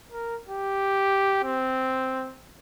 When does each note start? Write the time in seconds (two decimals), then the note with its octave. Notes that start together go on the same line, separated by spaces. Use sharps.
0.12 A#4
0.49 G4
1.44 C4